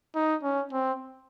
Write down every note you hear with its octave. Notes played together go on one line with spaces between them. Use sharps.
D#4
C#4
C4